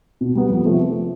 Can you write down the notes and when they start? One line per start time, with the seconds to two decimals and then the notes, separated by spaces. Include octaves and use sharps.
0.21 B2
0.35 G3 B3
0.50 F2
0.65 C3 F3 A3